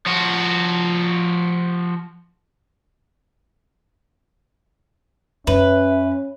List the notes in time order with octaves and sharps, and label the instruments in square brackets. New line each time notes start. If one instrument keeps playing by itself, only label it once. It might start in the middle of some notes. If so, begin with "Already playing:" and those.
[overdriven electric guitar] F3 F#4
[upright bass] F#2 [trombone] C#4 [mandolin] B4 [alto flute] E5